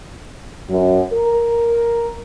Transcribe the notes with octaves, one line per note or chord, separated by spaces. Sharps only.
F#2
A#4